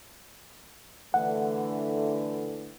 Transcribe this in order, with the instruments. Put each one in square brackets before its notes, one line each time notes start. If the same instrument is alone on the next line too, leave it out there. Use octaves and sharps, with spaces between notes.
[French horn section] D3 E3 A3 [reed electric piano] F#5